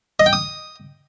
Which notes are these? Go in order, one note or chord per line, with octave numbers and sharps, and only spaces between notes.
D#5
G5
D#6